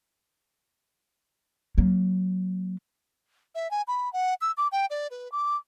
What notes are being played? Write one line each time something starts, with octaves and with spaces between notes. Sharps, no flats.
F#3 A#3
E5
G#5
B5
F#5
E6
D6
G5
D5
B4
D6